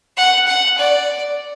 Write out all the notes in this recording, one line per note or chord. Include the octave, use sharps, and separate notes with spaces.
F#5
F#5
D5